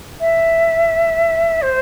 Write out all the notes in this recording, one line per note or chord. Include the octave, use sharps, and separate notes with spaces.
E5
C5